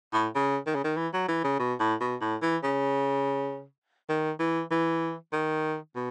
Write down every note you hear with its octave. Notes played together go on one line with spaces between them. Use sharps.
A2
C#3
D#3
C#3
D#3
E3
F#3
E3
C#3
B2
A2
B2
A2
E3
C#3
D#3
E3
E3
D#3
B2